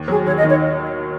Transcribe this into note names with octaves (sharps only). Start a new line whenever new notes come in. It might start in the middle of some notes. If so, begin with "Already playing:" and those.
Already playing: D#2
F#3 G#4
D#2 C#5
D#5
D#3 C#5